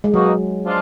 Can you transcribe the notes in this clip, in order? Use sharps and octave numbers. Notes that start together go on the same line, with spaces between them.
G#3
B2 F#3 A#3 D#4 F#4
F3 G#3 D4 F4